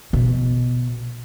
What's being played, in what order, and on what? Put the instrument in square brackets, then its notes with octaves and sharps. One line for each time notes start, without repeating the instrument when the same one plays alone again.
[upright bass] B2